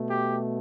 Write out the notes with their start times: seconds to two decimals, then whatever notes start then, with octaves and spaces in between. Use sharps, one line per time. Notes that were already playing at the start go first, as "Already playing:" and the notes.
Already playing: B2 A3
0.10 G4